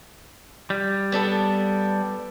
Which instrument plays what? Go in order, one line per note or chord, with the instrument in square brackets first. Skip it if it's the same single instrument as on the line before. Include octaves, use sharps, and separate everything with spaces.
[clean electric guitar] G3
[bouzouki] B3 D4 A4